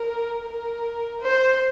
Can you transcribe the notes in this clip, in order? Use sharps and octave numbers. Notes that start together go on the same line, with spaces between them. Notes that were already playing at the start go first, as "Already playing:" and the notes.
Already playing: A#4
A#4
C5